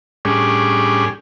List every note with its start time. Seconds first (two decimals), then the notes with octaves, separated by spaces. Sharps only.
0.25 A2 G3 C#4 D4 G#4